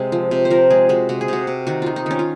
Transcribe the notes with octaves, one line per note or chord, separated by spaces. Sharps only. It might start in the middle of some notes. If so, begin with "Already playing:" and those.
Already playing: C3 G#3
F3
C3
C5
F3 A#4
G#3 G#4
G#3 F#4
C3 F#4
G#4
C3 F#4
C3
D#3 F#4
D#3 F4
D#4
D#3 C#4
F4